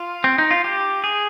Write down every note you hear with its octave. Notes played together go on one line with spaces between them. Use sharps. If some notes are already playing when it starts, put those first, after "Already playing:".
Already playing: F4
C4
D#4
F4
G4
G#4